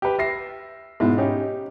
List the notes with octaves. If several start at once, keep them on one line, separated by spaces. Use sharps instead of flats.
G4 B4
E5 A#6 C7
G#2 B2 E4
C#4 D#4 G4